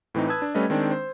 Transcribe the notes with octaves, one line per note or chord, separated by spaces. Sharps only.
A2 E3 C4 D#4
B4 A5 D#6 E6 G#6
D4
G3 A3 C#4 B4 D#5
D#3 G#3 C4 D4
C5